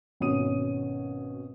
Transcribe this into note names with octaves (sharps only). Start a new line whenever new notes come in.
G#1 B2 C#4 D#6 D#7